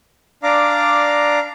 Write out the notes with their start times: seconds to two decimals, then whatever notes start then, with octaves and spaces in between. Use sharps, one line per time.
0.43 D4 D5 F5 A#5 D6